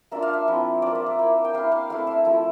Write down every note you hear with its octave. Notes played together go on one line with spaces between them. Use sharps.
A#3 D4 F4 E5
F5
E5
F3 C4 E4
A#3 F4 D5
E5
E5
A#3 E4
G5
A#3 E4 F5
F5
A3 C4 E4 F5
E5
F3 A3 E4